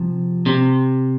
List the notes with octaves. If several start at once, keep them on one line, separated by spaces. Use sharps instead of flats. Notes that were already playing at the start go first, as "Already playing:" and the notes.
Already playing: C3 F3
C3